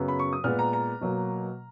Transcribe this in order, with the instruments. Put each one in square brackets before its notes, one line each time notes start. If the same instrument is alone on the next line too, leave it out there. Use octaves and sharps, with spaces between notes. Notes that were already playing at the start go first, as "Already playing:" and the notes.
Already playing: [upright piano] F#2 C#3 F#3 B3
B5
C#6
D#6
A#2 G#3 B3 F6
A#5
A#5
B2 F#3 A#3